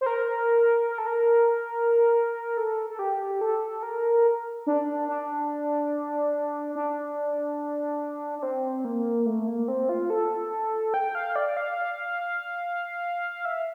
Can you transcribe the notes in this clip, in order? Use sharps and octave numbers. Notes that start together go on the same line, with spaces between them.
C5
A#4
A#4
A4
A#4
A4
A4
G4
A4
A#4
D4
D4
D4
D4
C4
A#3
A3
A#3
C4
F4
A4
G5
F5
D5
F5
E5